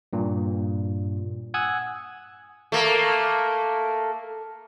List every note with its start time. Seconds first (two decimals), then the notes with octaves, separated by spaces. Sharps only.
0.13 G2 A#2
1.54 F#5 G#5 D#6 E6 F#6 G#6
2.72 A3 A#3